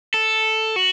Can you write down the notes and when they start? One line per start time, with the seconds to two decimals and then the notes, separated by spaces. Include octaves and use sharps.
0.14 A4
0.76 F#4